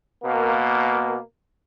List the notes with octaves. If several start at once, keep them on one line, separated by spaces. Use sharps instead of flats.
B2 A#3